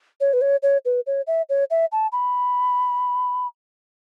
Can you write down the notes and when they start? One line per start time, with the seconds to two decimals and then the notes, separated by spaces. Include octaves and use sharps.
0.21 C#5
0.33 B4
0.41 C#5
0.63 C#5
0.85 B4
1.07 C#5
1.27 E5
1.49 C#5
1.70 E5
1.92 A5
2.12 B5